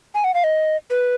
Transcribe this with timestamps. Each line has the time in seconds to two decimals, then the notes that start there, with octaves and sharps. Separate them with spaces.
0.15 G#5
0.24 F#5
0.34 F5
0.44 D#5
0.90 B4